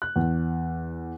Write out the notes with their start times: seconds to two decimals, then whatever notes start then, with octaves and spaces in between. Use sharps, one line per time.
0.02 F#6
0.16 E2